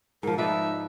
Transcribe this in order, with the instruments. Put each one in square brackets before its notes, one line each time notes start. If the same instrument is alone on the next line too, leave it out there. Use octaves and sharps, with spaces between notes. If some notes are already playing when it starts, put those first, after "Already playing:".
[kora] G#2 F3 [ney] A#4
[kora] F3 B4 D5 [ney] D#4 [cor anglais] E5